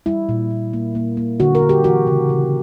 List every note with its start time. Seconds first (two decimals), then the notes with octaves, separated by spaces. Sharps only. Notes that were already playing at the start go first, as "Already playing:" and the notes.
0.06 G3 E4
0.29 A#2
0.51 A#2
0.73 A#3
0.95 A#3
1.17 A#3
1.40 D3 F#4
1.55 A#4
1.62 D3
1.69 G4
1.84 E3 F#4
2.07 C#3
2.29 C#3